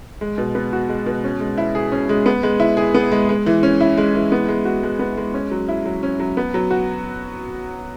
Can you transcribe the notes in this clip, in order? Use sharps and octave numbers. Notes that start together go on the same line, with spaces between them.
G#3
B2
B3
F#4
G#3
B2
C#4
G#3
E4
G#4
C#4
G#3
B3
G#3
E4
G#4
B3
G#3
G#3
E3
C#4
E4
G#3
E3
B3
G#3
F#4
G#3
B3
G#3
C#4
F#3
E4
F#3
C#4
F#3
B3
F#3
F#4